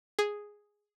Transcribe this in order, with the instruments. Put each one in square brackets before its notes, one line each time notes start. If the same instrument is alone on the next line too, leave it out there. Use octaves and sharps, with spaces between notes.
[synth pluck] G#4